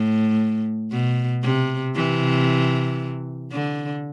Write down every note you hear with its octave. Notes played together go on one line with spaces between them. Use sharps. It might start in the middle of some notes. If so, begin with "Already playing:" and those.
Already playing: A2
B2
C3
C3 E3
D3